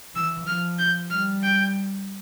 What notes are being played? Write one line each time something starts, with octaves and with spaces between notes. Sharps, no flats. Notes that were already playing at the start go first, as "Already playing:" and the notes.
E3 E6
F3 F6
G6
G3 F6
G5